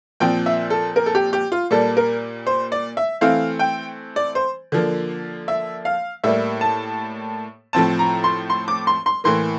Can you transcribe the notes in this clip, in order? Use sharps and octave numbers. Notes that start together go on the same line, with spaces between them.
A#2 F3 C4 G5
E5
A4
A#4
A4
G4
G4
F4
A#2 G3 A#3 A4
A#4
C5
D5
E5
E3 A3 C4 F5
G5
D5
C5
D3 F3 A#3
E5
F5
A2 G3 A#3 E5
A5
A2 F3 C4 A5
A#5
C6
C6
D6
C6
C6
A2 E3 A#3 C6